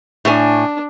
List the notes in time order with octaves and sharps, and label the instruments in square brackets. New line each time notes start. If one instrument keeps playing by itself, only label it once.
[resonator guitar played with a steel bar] A2 G#5 [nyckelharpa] D4